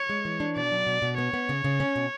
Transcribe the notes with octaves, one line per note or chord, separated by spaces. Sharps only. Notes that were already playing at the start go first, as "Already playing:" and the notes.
Already playing: C#5
G#3
E3
D4
B2 D5
F#3
B2
B2
B3 C#5
B3
C#3
C#3
C#4
B2